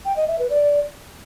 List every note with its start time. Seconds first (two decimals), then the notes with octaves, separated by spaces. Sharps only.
0.05 G5
0.16 D#5
0.28 E5
0.39 B4
0.50 D5